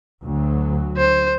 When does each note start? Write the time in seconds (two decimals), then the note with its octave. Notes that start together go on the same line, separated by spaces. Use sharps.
0.24 D2 F#3
0.97 C5